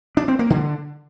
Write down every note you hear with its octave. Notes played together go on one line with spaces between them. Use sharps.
D4
C4
A#3
D3